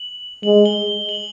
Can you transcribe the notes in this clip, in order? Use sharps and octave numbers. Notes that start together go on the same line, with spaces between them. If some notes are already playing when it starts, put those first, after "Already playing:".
Already playing: F#7
G#3 F#7
G7
F#7